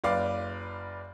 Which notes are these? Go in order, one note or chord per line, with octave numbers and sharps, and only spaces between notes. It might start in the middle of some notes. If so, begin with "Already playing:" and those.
F#1 B4 D5 F5 D6